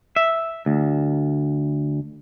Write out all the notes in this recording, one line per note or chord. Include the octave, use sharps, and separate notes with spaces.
E5
D2